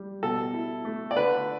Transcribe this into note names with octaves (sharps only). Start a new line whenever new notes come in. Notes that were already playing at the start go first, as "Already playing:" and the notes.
Already playing: G3
B2 A4
E4
A3
D5
D3 B4